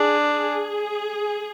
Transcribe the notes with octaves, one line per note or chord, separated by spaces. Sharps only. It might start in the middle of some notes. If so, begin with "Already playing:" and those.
Already playing: D4 G#4
G#4